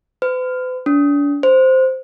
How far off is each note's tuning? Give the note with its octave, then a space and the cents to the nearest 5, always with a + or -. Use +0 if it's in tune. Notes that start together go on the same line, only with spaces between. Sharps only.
B4 +45
D4 -35
C5 -5